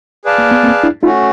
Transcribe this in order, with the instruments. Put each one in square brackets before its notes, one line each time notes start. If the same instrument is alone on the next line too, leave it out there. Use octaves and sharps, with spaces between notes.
[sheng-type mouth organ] G#4 B4 D5 F5 A5
[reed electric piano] A#3
B3
A#3 C4
D4 E4
[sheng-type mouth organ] A3 C#4 F#4 [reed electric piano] D#4 F4